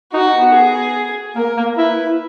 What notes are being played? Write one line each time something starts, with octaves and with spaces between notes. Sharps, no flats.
D#4 F#4
B3
G#4
A#3 A#4
A#3
E4 B4